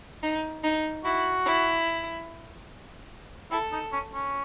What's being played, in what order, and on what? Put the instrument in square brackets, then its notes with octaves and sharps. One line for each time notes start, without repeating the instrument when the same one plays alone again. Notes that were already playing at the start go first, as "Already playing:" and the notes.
[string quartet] D#4
D#4
[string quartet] E4 [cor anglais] F#4
[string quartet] E4
[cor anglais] E4 [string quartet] A4
[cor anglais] D#4
C#4
C#4